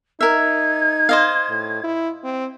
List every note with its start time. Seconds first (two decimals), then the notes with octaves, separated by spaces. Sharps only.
0.21 D#4 A#4 E5 G#6
1.09 C5 D#5 F5
1.49 A2
1.84 E4
2.24 C4